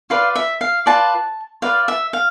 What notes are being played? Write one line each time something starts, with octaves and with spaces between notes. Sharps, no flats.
F4 B4 D5 F5
E5
F5
F4 B4 D5 A5
F4 B4 D5 F5
E5
F5